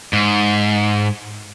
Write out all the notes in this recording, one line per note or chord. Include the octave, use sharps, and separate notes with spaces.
G#2